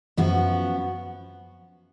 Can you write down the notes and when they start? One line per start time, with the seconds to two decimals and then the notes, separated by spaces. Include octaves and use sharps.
0.17 F#2 F3 B3 F#4